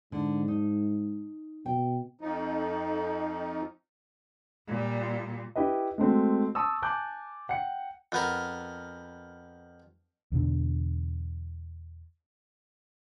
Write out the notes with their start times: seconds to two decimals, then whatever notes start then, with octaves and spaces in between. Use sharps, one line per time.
0.12 G#2 D3
0.48 D#4
1.66 B2 G5
2.21 F2 F3 D#4
4.67 A#2 G3
5.55 E4 G4 B4 D#5
5.98 G#3 A3 C4 F#4
6.55 A5 C#6 D#6 E6
6.82 G#5 A5 D6 F#6 G6
7.49 F#5 G5 C#7
8.12 F2 B3 A#4
10.32 E2 B2 D3